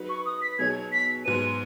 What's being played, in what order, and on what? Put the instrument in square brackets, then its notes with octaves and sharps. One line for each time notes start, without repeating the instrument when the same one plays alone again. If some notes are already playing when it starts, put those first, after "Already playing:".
Already playing: [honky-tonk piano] F#3 D#4 F#4 B4
[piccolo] C#6
D#6
B6
[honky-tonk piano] B2 F#3 D#4 G#4 C#5 [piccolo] G#6
[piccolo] B6
[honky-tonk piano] G#2 F#3 B3 [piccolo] D#7